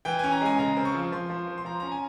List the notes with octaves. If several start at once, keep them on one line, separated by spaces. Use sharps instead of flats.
E3 G5
C#4 G#5
A#5
G#3 G#5
C#3 A#5
C4
C#6
F3
F3 C6
F3
C4
C6
F3 A#5
C#4 A#5
G#5